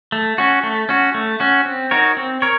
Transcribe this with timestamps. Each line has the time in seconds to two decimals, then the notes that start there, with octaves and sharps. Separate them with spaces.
0.12 A3
0.38 C#4 F#4
0.63 A3
0.89 C#4 F#4
1.14 A3
1.40 C#4 F#4
1.66 C4
1.91 D#4 F#4 A#4 C#5
2.17 C4
2.42 A#4 C#5